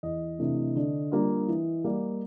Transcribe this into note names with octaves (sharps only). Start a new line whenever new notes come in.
E2 D#5
C3 E3 A3 D4
D3
G3 A#3 D4 F4
E3
G3 A#3